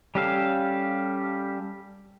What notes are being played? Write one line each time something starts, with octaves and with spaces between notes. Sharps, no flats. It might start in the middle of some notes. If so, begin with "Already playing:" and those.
G3 C#4 G4 A4 F5